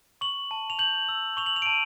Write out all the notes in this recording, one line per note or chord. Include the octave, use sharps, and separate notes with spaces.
C#6 F#7
A5
F7
G6 F#7
E6
C#6 F7
F#7
F7
D7
A5 D#7